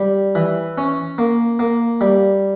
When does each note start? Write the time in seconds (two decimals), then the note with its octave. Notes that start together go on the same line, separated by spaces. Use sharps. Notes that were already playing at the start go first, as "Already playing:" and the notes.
Already playing: G3
0.35 E3
0.78 C#4
1.18 A#3
1.59 A#3
2.01 G3